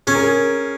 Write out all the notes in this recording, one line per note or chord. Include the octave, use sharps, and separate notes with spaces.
C#4 G#4
A#4
G#4